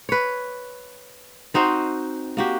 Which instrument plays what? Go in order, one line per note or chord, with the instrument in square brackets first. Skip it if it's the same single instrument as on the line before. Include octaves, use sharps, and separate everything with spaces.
[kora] B4 C#5
C4 D#4 F#4 C5
A#3 F#4 G4